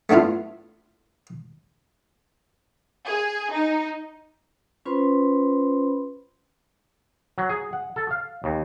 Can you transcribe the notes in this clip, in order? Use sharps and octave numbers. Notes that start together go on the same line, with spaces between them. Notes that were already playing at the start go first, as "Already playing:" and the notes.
A3 B3 D4 E4 F4
G#4
D#4
C#4 F4 B4 C5 B5 C6
F#3
G#4
F#5
A4
F5
D#2